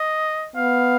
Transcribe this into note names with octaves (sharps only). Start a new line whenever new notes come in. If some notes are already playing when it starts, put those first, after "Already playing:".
Already playing: D#5
B3 F5